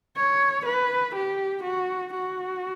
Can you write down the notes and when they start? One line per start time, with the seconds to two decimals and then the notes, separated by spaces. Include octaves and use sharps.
0.16 C#5
0.66 B4
1.15 G4
1.64 F#4
2.14 F#4